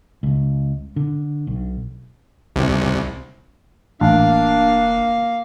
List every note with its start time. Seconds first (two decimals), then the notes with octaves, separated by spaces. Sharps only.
0.23 C#2
0.96 D3
1.47 B1
2.56 C2
4.01 E1 A1 A#3 D4 F5